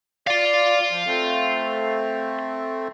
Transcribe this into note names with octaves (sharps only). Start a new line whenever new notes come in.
D5 F5 C6
F3
A3 C4